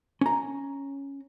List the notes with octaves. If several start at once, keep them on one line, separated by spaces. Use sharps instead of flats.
C#4 A#5